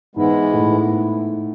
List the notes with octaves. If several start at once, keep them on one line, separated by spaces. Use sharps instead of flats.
G#2 E3 G#3 B3 E4
A2